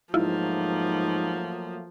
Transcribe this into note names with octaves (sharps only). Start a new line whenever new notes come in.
G#2 F3 F#3 A3 A#3 E4 F4